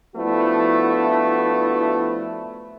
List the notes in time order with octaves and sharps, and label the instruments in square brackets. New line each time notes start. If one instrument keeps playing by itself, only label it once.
[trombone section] F3 A3 B3 D4 E4 F#4